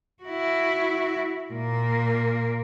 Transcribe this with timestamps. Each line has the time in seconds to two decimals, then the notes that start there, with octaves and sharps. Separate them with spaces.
0.24 E4 F#4
1.52 A#2 A#3